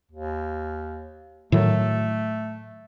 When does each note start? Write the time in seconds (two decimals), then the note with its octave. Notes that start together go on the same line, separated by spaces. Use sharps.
0.11 D#2
1.52 A2 D#3 F#3 A3